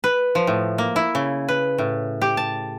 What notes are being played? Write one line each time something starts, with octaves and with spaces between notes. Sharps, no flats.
B4
F3
A2
A#3
E4
C#3
B4
A2
G4
A5